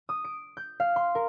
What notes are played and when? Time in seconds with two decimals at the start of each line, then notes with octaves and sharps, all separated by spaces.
0.09 D#6
0.25 D7
0.57 G6
0.80 F5
0.96 C6
1.15 A#4